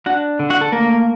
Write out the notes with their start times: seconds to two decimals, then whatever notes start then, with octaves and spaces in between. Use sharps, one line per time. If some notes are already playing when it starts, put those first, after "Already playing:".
0.06 D4 F#4 F#5
0.39 D3
0.50 F#4 F#5
0.61 A4
0.72 A3 A#3 A#4